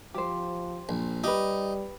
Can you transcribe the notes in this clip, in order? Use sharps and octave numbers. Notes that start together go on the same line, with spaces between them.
F3 G4 C5
A#1
G3 D#4 G4 B4